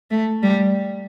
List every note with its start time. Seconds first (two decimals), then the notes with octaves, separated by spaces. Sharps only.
0.11 A3
0.43 G3